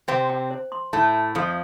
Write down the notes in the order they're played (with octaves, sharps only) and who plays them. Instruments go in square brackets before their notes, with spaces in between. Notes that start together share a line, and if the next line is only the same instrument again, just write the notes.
[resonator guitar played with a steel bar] C3 C4 [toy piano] G5
[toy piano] G5
C5
C6
[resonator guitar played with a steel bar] A2 A3 [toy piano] A5
[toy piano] A5
[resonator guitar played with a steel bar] F2 F3 [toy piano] A4